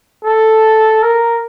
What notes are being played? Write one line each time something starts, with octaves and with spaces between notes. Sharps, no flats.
A4
A#4